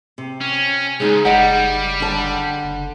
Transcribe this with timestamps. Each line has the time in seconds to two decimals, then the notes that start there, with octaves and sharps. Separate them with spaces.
0.18 C3
0.41 C#4
1.00 C#2 G#3 D#4 G#4
1.25 F#1 G3 D#5 F#5
2.00 D3 A5
2.63 F#1